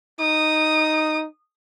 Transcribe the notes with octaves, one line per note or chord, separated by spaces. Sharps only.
D#4 D#6